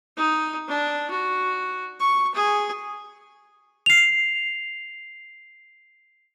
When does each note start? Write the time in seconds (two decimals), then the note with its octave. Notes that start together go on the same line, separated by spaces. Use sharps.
0.17 D#4
0.68 D4
1.11 F#4
2.00 C#6
2.35 G#4
3.86 C7 F7